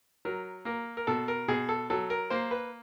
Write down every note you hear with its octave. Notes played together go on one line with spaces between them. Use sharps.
F#3 A#4
A#3 A#4
A#4
B2 A4
A#4
B2 G#4
A4
F#3 A4
A#4
A#3 C5
B4